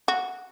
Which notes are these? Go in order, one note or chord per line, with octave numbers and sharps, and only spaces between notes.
F#4